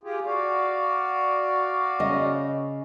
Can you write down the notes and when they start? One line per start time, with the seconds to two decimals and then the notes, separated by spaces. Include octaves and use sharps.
0.03 F4 G4 G#4
0.26 F#4 D5 F5
2.00 C#3 D#5